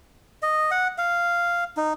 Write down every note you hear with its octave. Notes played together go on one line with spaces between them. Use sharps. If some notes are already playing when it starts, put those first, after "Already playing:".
D#5
F#5
F5
D#4